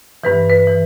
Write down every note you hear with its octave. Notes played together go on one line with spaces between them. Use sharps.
G2 E3 B4
B4
E3